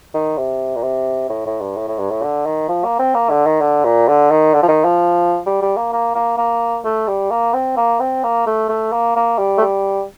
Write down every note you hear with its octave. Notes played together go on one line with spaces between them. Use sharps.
D#3
C3
A#2
C3
A2
A2
G2
A2
A2
G2
A2
D3
D#3
F3
A#3
C4
A#3
D3
D#3
D3
A#2
D3
D#3
D3
F3
D#3
F3
G3
G3
A#3
A#3
A#3
A#3
A3
G3
A#3
C4
A#3
C4
A#3
A3
A3
A#3
A#3
G3
A3
G3